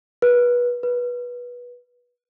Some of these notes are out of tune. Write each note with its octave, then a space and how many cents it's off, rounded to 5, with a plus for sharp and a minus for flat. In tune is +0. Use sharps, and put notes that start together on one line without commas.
B4 -25
B4 -20